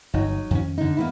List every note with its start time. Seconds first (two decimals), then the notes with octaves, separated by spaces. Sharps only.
0.14 G1 F#3 D#4
0.51 F2 D#3 C#4
0.78 D3 D#4
0.97 A#3 B3 E4